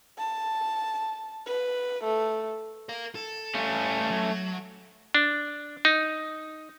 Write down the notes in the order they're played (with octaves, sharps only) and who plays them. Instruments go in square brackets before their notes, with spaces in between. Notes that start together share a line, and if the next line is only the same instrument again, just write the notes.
[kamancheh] A5
B4
A3
[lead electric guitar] A#4 F5
A4
[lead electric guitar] G3 F5 [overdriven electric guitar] A3 C#4
[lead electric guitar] F#3
[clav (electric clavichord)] D4
D#4